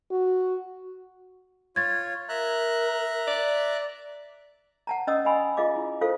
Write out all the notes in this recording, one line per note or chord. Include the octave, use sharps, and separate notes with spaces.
F#4
F4 C#5 G#6 A6
A#4 E5 A#5 F#6
D5
F#5 A5 A#5
C#4 D#5 D#6 E6
D#5 F#5 G#5 B5 C6
F4 G#4 D#5 F5 D6
E4
F4 A4 C5 F5